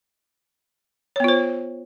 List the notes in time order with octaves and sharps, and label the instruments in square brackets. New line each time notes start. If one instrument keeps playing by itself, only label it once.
[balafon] C#5
B3
F4
C5